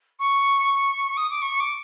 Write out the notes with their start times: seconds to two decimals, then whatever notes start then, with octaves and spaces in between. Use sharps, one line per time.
0.19 C#6
1.17 D#6
1.30 D6
1.41 C#6
1.60 D6